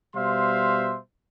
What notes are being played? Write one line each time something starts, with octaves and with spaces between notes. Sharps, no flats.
B2 G3 C5 E5 F5 C6